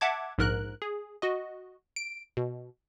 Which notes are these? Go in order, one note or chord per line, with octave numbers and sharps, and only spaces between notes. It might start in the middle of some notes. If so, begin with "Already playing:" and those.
E5 F#5 A5 D6 G#6
A#1 G#2 A#4 F#6
G#4
F#4 D#5
D7
B2